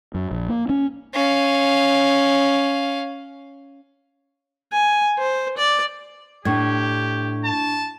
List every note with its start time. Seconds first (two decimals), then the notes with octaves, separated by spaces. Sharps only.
0.15 F#2
0.31 A#1
0.49 A#3
0.69 C#4
1.14 C#4 F5
4.72 G#5
5.19 C5
5.57 D5
6.45 A2 D4 G4 C#6 G#6
7.45 A5